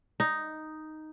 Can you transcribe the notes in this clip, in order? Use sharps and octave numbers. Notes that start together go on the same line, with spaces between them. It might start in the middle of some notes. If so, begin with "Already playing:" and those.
D#4